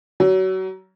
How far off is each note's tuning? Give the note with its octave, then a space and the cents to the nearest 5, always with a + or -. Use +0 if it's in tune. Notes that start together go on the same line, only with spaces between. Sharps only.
F#3 +25